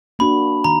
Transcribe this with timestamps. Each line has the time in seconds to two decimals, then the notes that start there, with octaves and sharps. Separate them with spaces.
0.19 A#3 D4 F#4 B5
0.64 D#3 A#5